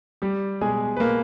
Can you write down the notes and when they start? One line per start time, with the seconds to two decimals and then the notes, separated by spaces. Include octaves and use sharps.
0.22 G3 G4
0.61 B2 G#3 G#4
0.96 B4
1.00 B2 A#3 A#4